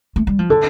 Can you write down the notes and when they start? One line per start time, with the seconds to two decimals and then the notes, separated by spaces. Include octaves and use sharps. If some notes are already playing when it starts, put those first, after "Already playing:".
0.16 A3
0.27 G3
0.39 F3
0.50 D3 A4